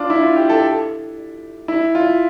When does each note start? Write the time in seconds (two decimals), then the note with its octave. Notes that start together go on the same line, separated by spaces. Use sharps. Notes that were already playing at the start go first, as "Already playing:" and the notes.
Already playing: D4 F4
0.10 E4
0.23 F4
0.36 G4
0.49 A4
1.68 E4
1.95 F4